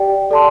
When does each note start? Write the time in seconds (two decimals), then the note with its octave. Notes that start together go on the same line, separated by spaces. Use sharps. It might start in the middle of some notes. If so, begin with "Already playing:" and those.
Already playing: G4 D5 G5
0.31 A4 D5 A5 C6